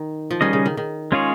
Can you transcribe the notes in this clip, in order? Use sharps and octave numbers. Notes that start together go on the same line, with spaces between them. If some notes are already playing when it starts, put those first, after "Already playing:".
Already playing: D#3
F3
D#3 G3 C#4 G#4 D#5
C#3
D#3
D#3
G#3 C#4 F4 G#4 C#5